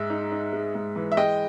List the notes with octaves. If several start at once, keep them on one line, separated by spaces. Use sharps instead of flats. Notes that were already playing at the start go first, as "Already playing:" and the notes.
Already playing: G#2 G#3 E5
D#4
D#4
G#3
G#2
E3
E5
G#3 D#5 G5